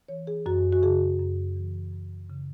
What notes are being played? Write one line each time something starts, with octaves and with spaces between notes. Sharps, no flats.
E3 C#5
G#4
F#2 F#4
F#4
C#3 G#4
F#2
E3
F#2
C#3